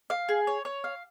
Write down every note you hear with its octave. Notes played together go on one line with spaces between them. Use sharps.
F5
G#4
C#5
C#5
F5